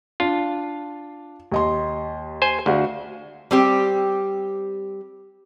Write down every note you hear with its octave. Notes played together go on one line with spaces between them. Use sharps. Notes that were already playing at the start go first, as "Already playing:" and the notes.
D4 F4
D#2 D#5 C6
C5 G#5
D2 F#4 F5
G3 C4 G4